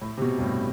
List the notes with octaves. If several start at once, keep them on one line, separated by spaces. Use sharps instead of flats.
A2
C3
B2
G2
A2